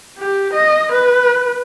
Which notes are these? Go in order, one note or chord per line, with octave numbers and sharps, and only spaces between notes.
G4
D#5
B4